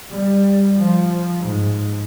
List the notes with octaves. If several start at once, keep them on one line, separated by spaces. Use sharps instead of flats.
G3
F3
G#2